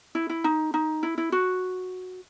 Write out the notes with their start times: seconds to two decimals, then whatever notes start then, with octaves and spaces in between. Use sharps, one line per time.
0.15 E4
0.29 E4
0.44 D#4
0.74 D#4
1.03 E4
1.18 E4
1.32 F#4